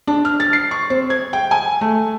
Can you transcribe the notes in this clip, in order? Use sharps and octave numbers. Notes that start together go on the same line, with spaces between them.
D4
F6
A6
C7
C#6
C4
G#6
G5
G#5
A3